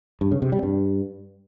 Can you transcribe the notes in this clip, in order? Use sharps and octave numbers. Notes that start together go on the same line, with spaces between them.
G2
C#3
C3
G3
G2